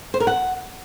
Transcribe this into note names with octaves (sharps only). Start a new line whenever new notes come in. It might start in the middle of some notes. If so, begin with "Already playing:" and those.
C5
A#4
F#5